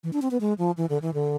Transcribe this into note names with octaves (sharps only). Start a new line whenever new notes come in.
E3
D4
C4
B3
G#3
F3
E3
D3
E3
D3